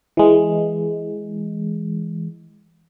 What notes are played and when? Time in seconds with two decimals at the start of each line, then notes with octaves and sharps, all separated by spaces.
0.17 E3 G#3